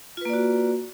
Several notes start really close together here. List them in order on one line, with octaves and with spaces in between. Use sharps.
F4 B4 A#3 D5 F#4